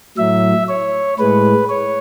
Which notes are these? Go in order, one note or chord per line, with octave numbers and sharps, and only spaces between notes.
A2 F#3 E5
C#5
A2 G#3 B4
C#5